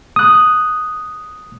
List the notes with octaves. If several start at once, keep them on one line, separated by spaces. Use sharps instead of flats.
D#6 F#6